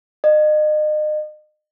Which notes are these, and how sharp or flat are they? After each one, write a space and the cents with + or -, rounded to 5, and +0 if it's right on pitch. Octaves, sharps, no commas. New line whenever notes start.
D#5 -35